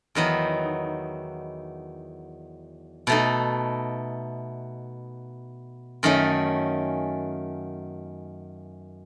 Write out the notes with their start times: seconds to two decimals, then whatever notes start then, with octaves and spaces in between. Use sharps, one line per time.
0.15 E2 D#3 F#3 B3 D#4
3.07 B2 A3 D#4
6.03 F#2 D#3 A3 C#4